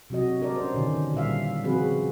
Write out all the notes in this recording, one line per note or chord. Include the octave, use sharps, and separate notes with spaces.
C3 F#3 F#4 D#5
D4 A#4 D5
C#4 C5
B2 D3 D#3
A#2 G3 E5 F5
C#3 F3 C4 F#4 G#4 B4